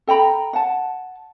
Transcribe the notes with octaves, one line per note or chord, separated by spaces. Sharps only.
A4 G5 A#5 B5
F#5 A5